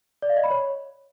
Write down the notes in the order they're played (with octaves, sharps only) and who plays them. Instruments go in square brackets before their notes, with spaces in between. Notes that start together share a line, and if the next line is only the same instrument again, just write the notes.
[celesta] D5
F5
D#5
B5
C#5